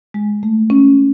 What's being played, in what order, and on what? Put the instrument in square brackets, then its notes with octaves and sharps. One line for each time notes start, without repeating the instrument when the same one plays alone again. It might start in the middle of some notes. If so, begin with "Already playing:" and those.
[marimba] G#3
A3
C#4